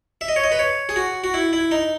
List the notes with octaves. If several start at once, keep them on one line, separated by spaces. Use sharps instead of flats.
E5
D#5
C#5
D#5
B4
C#5
G#4
F#4
F#4
E4
E4
D#4